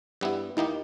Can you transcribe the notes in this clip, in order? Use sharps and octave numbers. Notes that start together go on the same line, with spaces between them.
G2 G3 B3 E4
D#2 D#3 A#3 D#4 E4 G4